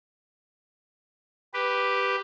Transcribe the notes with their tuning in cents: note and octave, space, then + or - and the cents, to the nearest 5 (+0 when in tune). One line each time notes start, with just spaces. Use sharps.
G4 +0 B4 +0